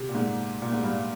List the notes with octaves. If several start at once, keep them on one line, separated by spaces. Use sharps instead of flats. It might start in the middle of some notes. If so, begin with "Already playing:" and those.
Already playing: C3
A#2
G#2
A#2
G#2
G2